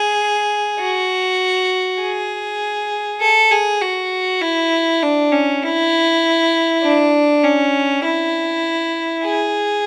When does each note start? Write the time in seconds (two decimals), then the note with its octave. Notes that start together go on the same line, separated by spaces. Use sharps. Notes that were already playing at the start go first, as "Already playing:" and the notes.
Already playing: G#4
0.80 F#4
2.01 G#4
3.21 A4
3.52 G#4
3.82 F#4
4.42 E4
5.03 D4
5.32 C#4
5.63 E4
6.83 D4
7.43 C#4
8.03 E4
9.24 G#4